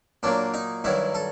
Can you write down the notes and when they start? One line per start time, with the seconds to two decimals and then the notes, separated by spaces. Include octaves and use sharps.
0.23 A#2 F#3 A#3 D4
0.54 D#4
0.84 G2 D#3 F#3 E4
1.15 A4